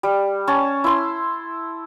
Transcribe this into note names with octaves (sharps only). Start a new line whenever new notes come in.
G3
C#4 C#5 A5
E4 C6